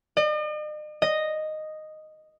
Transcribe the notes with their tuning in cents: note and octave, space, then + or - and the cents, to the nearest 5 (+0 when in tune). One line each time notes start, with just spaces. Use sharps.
D#5 -45
D#5 -5